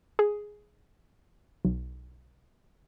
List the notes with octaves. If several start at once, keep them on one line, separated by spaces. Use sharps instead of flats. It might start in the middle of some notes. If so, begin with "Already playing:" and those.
G#4
B1